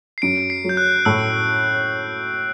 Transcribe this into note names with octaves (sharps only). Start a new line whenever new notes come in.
C7
F#2 D7
C7
F#3
G6
F#6
A2 E6